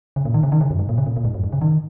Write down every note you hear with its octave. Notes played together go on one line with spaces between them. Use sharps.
C#3
A#2
D#3
C#3
D#3
C#3
F#2
G#2
A#2
C#3
A#2
A#2
G#2
F#2
G#2
C#3
D#3